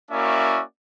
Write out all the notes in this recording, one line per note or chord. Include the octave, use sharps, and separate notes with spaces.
A#3 C#4 E4 F#4 D5 E5